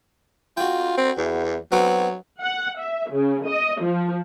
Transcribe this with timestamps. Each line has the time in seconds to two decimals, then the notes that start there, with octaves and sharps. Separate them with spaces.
0.57 F4 F#4 G5
0.97 C4
1.18 E2
1.72 F#3 B3 C4 F#4
2.40 F#5
2.78 E5
3.11 C#3
3.46 D#5
3.80 F3